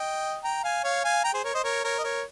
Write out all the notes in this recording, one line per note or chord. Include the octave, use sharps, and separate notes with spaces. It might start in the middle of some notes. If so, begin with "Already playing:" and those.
Already playing: D#5 G5
G5 A#5
F5 G#5
C#5 F5
F5 G#5
G5 A#5
G#4 C5
A#4 C#5
C5 D#5
A#4 C#5
A#4 C#5
D#5
A#4 C#5